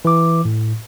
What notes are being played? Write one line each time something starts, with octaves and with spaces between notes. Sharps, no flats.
E3 D6
A2